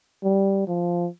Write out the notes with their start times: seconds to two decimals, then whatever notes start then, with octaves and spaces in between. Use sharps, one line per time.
0.24 G3
0.68 F3